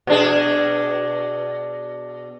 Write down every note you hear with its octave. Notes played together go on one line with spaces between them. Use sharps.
B2 D4 G#4